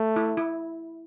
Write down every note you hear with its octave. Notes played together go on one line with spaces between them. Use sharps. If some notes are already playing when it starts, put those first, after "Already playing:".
Already playing: A3
E4
E4